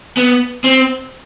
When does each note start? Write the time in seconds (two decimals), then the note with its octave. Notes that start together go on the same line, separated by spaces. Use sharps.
0.17 B3
0.64 C4